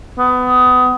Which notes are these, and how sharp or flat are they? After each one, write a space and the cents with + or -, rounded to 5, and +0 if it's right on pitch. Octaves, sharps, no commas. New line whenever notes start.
B3 +25